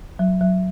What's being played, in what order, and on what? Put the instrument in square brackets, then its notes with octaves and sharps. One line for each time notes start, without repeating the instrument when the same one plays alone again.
[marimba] F#3
F#3